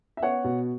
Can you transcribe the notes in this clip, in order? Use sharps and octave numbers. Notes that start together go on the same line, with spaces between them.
E5
B3 C#5 F#5
B2